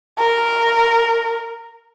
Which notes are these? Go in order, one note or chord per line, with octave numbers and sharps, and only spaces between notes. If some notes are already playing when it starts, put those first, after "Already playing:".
A#4